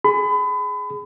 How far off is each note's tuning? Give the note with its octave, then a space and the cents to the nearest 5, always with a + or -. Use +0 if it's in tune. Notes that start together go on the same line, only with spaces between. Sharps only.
G#4 +0 B5 +30